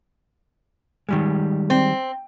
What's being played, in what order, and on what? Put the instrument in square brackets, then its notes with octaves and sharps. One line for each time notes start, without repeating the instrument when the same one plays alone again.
[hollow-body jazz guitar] D#3 G3 G#3
[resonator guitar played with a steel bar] C4